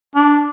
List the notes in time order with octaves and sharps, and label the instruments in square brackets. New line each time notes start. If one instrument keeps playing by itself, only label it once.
[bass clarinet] D4